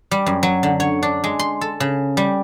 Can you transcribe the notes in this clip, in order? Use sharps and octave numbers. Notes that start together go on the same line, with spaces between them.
G3
F#2
F#3
D3
C#5
D4
G#3
C6
A4
C#3
G3